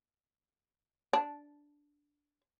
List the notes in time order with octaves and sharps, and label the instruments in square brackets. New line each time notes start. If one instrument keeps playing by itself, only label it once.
[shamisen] D4